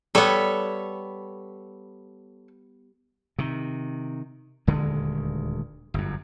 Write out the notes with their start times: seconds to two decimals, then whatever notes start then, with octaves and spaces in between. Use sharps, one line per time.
0.15 G3 B3 A4 C#5
3.38 C3 D#3
4.67 D#1 D2 D3 G#3
5.94 G1 F#2